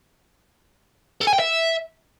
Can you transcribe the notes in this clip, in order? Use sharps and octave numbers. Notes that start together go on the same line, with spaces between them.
A4
G#5
G5
E5